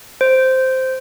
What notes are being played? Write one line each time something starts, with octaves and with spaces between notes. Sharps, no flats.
C5